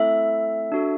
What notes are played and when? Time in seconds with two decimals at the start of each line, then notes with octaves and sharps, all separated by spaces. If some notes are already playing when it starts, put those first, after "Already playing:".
Already playing: A3 C4 E4 A4 E5
0.72 D4 F#4 A4